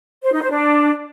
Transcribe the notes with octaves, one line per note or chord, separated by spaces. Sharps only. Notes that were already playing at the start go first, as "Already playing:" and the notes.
C5
D#4
C5
D4